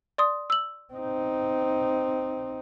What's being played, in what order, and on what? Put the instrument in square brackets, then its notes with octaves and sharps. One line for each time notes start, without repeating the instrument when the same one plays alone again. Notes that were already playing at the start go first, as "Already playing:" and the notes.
[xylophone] D5 C6 D#6
E6 F#7
[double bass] C4 D#4